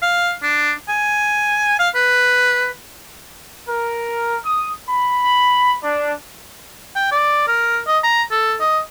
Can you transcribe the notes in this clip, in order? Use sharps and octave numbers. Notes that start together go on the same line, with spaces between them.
F5
D4
G#5
F5
B4
A#4
D#6
B5
D4
G5
D5
A#4
D#5
A#5
A4
D#5